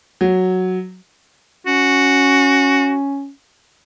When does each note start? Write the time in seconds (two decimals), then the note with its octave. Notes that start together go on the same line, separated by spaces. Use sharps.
0.21 F#3
1.67 C#4 F#4